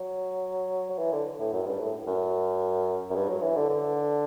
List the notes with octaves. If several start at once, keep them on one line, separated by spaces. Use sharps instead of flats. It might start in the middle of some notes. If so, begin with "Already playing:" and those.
Already playing: F#3
F#3
E3
D3
A2
F#2
G2
A2
F#2
F#2
G2
F#3
E3
D3
D3